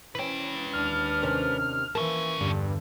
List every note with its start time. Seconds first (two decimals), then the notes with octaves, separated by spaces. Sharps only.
0.15 E3 C#4 B4 G5
0.73 D#2 D4 F6
1.22 C3 D#3 C#4
1.95 E3 F3 A#3 C#4
2.41 E2 G2 D3